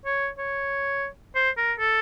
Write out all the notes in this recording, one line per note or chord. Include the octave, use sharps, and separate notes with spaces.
C#5
C#5
C5
A#4
A4